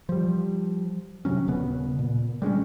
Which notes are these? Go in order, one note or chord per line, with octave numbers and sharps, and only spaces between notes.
F3 G3
C3 D#3 F#3 C#4
D#1 C#3 B3
A#2
G3 G#3 C4 C#4